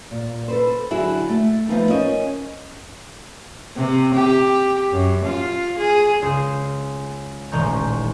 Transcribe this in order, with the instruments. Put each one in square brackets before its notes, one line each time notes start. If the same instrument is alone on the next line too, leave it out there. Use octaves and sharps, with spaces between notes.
[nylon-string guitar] A#2
A4 B4 C5
D3 F#3 E4 F#4 G#4
A3
F3 F#3 A3 B3 D#4 F4
C#4 A#4 C5 D#5
[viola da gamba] C3
G4
F#2
F4
G#4
[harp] C#2 G#4 D#6 G6 C7 E7
D#1 A1 G#3 A#5 C#6 G6